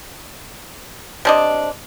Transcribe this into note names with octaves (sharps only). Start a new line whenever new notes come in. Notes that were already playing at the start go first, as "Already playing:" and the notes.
C3 D4 D#5